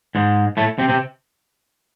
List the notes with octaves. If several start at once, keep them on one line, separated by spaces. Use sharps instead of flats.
G#2 G#3
A2 A3
C3 C4
C3 C4